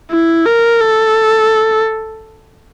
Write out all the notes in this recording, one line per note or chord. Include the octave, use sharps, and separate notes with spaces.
E4
A#4
A4